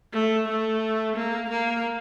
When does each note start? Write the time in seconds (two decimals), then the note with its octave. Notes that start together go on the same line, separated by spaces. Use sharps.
0.13 A3
0.48 A3
1.16 A#3
1.50 A#3